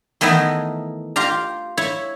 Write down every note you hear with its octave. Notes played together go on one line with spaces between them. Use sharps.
D#3 E3 A3 B3 D#4 E4
F4 G4 F5 A#5
E4 C#5